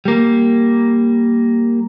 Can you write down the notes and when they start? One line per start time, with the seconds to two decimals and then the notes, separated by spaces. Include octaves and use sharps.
0.05 G3 A#3